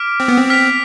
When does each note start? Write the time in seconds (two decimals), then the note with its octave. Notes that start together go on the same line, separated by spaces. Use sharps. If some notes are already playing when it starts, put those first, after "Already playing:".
Already playing: D6 F6 B6 D7
0.20 C4
0.28 B3
0.38 C4
0.50 F6 B6 D7 F7